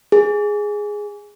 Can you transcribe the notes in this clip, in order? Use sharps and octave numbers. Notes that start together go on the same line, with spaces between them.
G#4